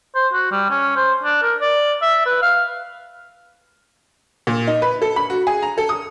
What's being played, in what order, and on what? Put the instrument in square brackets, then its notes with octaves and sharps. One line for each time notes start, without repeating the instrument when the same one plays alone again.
[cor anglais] C5
F#4
G3
C#4
C5
D4
A#4
D5
E5
B4
F5
[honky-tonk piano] A#2
D#4
B4
A4
B5
F#4
G#4
A#5
A4
D#6